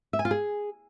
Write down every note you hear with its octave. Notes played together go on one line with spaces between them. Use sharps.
E5
G#5
F4
G#4